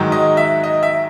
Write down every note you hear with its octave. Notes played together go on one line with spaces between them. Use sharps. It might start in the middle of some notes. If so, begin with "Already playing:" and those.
Already playing: G#2 D#3 F#3
D#5
E5
D#5
E5